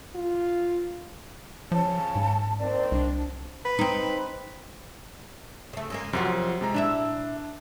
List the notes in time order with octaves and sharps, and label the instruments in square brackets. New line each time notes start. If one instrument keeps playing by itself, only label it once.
[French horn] F4
[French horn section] C#3 C#4 [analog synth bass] F3 [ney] A5
[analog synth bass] G#2
[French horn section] D#3 A#3 C4 [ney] D5
[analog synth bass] C2 [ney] D4
[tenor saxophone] B4
[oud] C4 D#4
C#3 A3
C#3 G#3 A#3
[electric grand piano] F#2 C3 [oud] F3 F4 F#4
[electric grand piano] C3 G#3 A#5
[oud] A#2 E4 E5 [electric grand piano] D4 E7